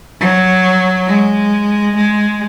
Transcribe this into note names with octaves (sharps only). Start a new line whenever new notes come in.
F#3
G#3
G#3